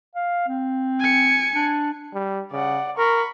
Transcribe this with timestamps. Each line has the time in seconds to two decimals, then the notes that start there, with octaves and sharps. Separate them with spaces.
0.15 F5
0.48 C4
1.00 G#5 C#7
1.54 D4
2.14 G3
2.52 C#3 D5 F#5
2.98 A#4 B5 C#6